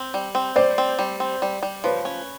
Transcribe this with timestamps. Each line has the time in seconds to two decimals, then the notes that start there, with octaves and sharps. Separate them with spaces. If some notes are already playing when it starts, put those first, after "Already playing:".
Already playing: C4
0.14 G3
0.35 C4
0.56 G3 C5 D5
0.78 C4
0.99 G3
1.20 C4
1.42 G3
1.63 G3
1.84 F3 B4 C#5
2.05 C#4